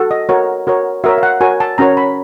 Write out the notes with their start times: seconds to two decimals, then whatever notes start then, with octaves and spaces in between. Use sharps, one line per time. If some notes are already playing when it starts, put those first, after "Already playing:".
Already playing: F#4 A4
0.11 D#5
0.29 F#4 A#4 C#5
0.67 F#4 A#4 C#5
1.04 F#4 A#4 C#5 E5
1.18 F5
1.23 F#5
1.41 F#4 A#4 C#5 G#5
1.60 A5
1.78 C#4 F#4 A#4 C#5 A#5
1.97 B5